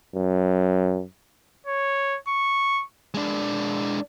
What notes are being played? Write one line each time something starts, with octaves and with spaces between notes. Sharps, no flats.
F#2
C#5
C#6
G#3 D4